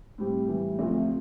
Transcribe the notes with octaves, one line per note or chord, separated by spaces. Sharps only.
A2 G3 C4 G4
A2 E3 G3
D2 C3 F3 A3